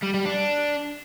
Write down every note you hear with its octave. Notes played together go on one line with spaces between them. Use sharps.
G3
G3
D4